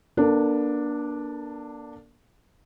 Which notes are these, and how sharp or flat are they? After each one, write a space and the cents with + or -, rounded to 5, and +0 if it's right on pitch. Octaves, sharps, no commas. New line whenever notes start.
A#3 +45 D4 +0 A4 +45